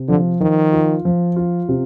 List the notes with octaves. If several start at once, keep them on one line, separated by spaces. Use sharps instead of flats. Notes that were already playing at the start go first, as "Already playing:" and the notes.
Already playing: C3
D3 F3
D#3 F3
F4
F3
F4
C3